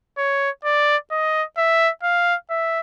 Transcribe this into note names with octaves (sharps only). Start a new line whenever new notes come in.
C#5
D5
D#5
E5
F5
E5